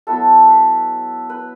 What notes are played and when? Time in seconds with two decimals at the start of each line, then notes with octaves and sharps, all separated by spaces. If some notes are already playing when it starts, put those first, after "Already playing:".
0.07 F#3 B3 E4 A4
0.48 B4
1.30 B4